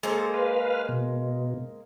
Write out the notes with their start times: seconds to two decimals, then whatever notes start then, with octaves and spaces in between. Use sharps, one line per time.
0.03 G#3 A#3 A4 C5
0.34 B4 F5
0.89 B2